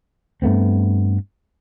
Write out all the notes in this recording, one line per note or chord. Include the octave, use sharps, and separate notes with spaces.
G2 A3 B3 C4